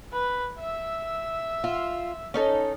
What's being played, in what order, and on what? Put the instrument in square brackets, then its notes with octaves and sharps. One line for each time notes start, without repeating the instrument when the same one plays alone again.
[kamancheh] B4
E5 E6
[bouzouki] F4
C#4 D#4 A4